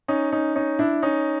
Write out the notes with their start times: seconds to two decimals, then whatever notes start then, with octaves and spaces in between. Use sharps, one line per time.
0.08 C#4 D#4
0.32 C#4 D#4
0.55 C#4 D#4
0.79 D4 E4
1.03 C#4 D#4